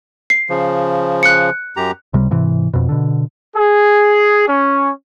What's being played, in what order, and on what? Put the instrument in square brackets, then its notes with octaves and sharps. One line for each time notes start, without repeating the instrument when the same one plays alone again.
[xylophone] C7
[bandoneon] C#3 F3
[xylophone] F#6 C#7
[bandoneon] F#2 G4 A#5
[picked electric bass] C#2 C3 G3
G#2 C3 E3
F2 B2
B2 D3
[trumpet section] G#4
C#4